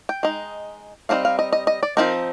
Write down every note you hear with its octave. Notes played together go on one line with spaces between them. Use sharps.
G5
G#3 D#4
G3 C4 D#4 F5
F5
D#5
D#5
D#5
D5
F3 G#3 C4 D#4 A#4